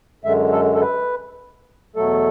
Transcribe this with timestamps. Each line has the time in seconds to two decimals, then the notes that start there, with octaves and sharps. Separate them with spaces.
0.24 F#2 D3 G#3 E5
0.52 A4
0.74 A4
0.81 B4
1.96 E2 B2 F#3 A3 A4